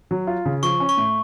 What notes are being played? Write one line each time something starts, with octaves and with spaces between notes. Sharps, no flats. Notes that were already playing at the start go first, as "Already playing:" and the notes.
F#3
F4
C#3
F3 C#6
C#4
C#6
A2